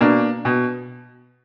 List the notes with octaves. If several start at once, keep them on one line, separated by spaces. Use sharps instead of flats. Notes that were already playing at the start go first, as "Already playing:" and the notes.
B2 A#3 D4
B2